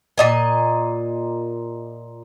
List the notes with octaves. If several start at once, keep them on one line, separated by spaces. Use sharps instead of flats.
A#2 D#5 G#5